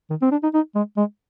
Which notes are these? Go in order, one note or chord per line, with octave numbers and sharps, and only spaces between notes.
D#3
C4
D4
D#4
D#4
G#3
G#3